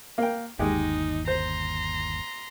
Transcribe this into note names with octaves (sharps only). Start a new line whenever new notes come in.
A#3 G5
G1 D#2 G#3 D#4 G4
C5 A#5 C6